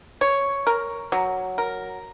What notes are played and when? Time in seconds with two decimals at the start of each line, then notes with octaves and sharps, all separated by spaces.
0.21 C#5
0.67 A#4
1.12 F#3
1.58 A#4